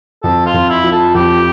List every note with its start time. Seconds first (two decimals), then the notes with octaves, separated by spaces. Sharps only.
0.23 F2 A4
0.46 F4
0.54 F2
0.70 E4
0.84 F3
0.92 A4
1.15 F2 G4